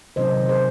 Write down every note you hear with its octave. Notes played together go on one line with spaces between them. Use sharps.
C3 D#3 F#3 C#4 C5 D#5
G#4 C5